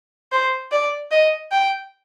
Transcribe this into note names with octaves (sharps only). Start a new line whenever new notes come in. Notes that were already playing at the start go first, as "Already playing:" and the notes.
C5
D5
D#5
G5